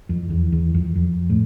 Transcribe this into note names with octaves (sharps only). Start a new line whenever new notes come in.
F2
E2
E2
F2
F2
A2